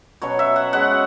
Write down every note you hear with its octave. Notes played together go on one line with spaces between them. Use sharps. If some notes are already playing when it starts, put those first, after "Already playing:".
B2 F#3 C#4 C#5
E5
F#5
B2 G#3 C#4 F#5